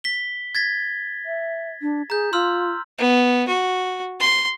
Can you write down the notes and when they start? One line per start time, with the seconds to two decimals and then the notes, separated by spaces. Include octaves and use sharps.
0.04 B6 G7
0.55 G#6 A6 B6
1.26 E5
1.82 D4
2.10 G#4 A#5 G6
2.33 F4 C6 E6 F6
2.98 B3
3.48 F#4
4.20 C6